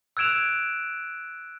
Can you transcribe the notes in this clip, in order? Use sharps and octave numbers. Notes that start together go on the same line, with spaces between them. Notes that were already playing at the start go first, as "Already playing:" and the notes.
E6 F#6 G#6 D7 E7 F7